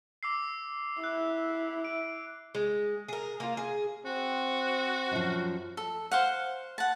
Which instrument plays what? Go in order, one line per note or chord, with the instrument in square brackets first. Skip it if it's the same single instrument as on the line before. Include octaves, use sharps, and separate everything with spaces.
[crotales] D6 E6 C7
[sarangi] E4 [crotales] D6 F#6
[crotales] D7
[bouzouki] G#3
G#4 A#4
A#3 F4
G#4
[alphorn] C4 [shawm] F#4
[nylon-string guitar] F#2 F3
[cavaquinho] A4
C5 F5 F#5
F#5 A5